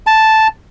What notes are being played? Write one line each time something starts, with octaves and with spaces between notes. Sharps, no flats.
A5